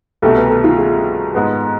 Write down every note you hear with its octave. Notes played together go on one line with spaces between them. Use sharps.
C2 B2 A3 A4
B4
A4
F4
G#4
G#2 G#3 B3